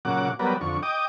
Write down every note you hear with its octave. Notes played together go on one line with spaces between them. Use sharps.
A#2 C#3 F#3 F#5 D6
F#3 G3 B3 A#4 B4 D5
F2 D3 C#6
D#5 G5 D6 D#6